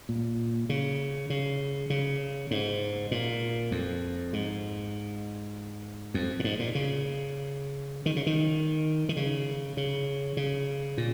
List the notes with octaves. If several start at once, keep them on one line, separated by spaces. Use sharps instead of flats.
A#2
C#3
C#3
C#3
G#2
A#2
F2
G#2
F2
A#2
G#2
A#2
C#3
D#3
C#3
D#3
D#3
C#3
C#3
C#3
A#2